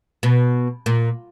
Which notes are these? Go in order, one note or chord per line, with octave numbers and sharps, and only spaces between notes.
B2
A#2